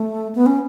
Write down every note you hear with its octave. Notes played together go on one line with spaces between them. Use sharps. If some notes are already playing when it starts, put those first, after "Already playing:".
Already playing: A3
B3
C#4